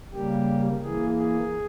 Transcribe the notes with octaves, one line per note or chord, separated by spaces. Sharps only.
C#3 G3 A#3 G4
E3 A#3 G#4
G#4